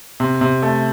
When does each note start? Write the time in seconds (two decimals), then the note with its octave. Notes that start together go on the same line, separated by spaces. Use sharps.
0.20 C3
0.41 C3
0.62 A3